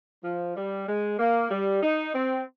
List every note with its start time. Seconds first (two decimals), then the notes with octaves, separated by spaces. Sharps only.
0.23 F3
0.56 G3
0.87 G#3
1.19 A#3
1.51 G3
1.83 D#4
2.14 C4